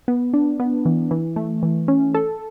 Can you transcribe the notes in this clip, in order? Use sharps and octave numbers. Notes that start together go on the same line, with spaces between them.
B3
D4
B3
E3
E3
A3
E3
C#4
A4